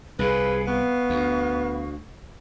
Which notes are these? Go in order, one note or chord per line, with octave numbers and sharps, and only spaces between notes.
C2 C3 G#4 B4 F5 B5
B3 F5 C#6
D2